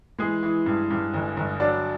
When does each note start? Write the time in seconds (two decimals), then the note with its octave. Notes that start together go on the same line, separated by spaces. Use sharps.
0.19 E3 G#3 G#4
0.43 E3
0.66 G2
0.90 G2
1.14 G1
1.37 G1
1.60 F#3 D4 D5